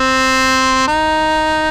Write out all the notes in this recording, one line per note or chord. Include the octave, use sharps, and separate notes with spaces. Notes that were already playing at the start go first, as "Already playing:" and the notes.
Already playing: C4
D#4